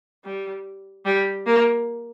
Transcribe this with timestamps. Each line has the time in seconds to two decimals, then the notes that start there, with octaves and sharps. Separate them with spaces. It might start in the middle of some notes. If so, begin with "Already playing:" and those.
0.25 G3
1.05 G3
1.47 A#3